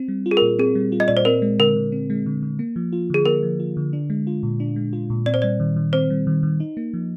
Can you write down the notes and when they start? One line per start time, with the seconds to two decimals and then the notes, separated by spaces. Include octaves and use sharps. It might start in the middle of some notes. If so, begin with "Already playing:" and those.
Already playing: C4
0.08 G3
0.26 F4
0.31 G#4
0.37 A#4
0.42 A#2
0.59 C4 G#4
0.75 G3
0.92 F4
1.00 D#5
1.08 A#2 D5
1.17 C5
1.25 C4 A#4
1.42 G#3
1.59 D3 A#4
1.76 D3
1.92 C4
2.10 G#3
2.26 D3
2.43 D3
2.59 A#3
2.76 F3
2.92 F4
3.10 D3 G#4
3.26 A#3 A#4
3.43 F3
3.60 F4
3.77 D3
3.93 D4
4.10 G#3
4.27 F4
4.43 A#2
4.60 D4
4.76 G#3
4.93 F4
5.10 A#2
5.26 C4 D5
5.34 C5
5.42 G3 D5
5.60 D#3
5.76 D#3
5.93 C4 C5
6.10 G3
6.27 D#3
6.43 D#3
6.60 D#4
6.77 A#3
6.94 F3